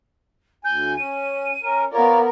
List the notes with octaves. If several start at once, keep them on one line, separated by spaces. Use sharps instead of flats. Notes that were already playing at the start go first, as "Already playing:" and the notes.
D2 G#5 G6
C#4 D#7
C#4 A#4
B3 F4 A#4 C#5 D5